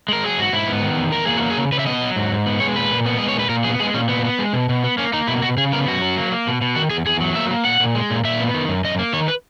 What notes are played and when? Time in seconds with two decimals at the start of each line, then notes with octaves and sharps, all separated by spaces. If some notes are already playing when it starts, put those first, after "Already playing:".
0.08 G#3 A#4
0.23 F#3 G#4
0.38 G#2 F#4
0.52 G#2 E4
0.68 B3
0.83 D#3
0.97 E2
1.12 E2 A#4
1.25 A#3 G#4
1.37 F#4
1.42 F#3
1.50 G#4
1.57 C#3
1.72 C#3 B4
1.79 E5
1.86 B3 D#5
2.02 F#3
2.16 G#2
2.32 G#2
2.46 B3
2.60 G#3 C#5
2.76 A#2 B4
2.91 A#2
3.06 B3
3.19 G#3 D#5
3.29 C#5
3.35 A#2 B4
3.49 A#2 A#4
3.64 B3 G#4
3.80 G#3 G#4
3.94 A#2 C#4
4.09 A#2 B3
4.25 B3
4.39 G#3
4.53 B2
4.69 B2
4.84 B3
4.98 A#3 C#4
5.13 A#3 D#4
5.27 B2 E4
5.42 B2 F#4
5.57 C#3 G#4
5.72 B3 A#4
5.88 F#2 F#4
6.02 F#3
6.17 A#3
6.32 A#3
6.47 B2
6.61 B2
6.76 D#3 F#4
6.91 E2 G#4
7.06 E2 G#4
7.21 F#3
7.35 A#3 E5
7.51 A#3
7.65 A#2 F#5
7.80 A#2
7.95 G#3
8.10 A#2
8.24 A#2 E5
8.40 B3
8.54 D#3
8.69 F#2
8.84 F#2 D#5
8.99 A#3
9.13 D#3 C#5
9.28 B4